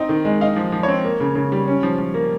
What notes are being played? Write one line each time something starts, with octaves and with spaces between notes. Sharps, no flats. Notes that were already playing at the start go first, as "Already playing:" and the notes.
Already playing: C4 D#4
D#3
G#3
D#4 F5
F3
F3
C4 C#5
A#3
C#3
C#3
G3
C#4
F3
F3
A#3